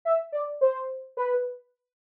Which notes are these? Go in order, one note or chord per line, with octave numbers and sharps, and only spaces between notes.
E5
D5
C5
B4